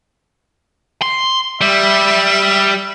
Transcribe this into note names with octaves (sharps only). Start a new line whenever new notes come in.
C6
G3 E5